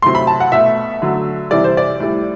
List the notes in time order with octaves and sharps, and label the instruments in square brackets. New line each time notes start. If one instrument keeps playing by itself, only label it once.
[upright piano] C3 F#3 A3 C6
B5
A5
F#5
B2 A3 E5
D3 F#3 A3
C3 E3 G3 D5
C5
D5
A2 G3